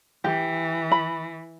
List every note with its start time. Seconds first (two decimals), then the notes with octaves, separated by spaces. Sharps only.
0.24 E3 G4
0.92 B5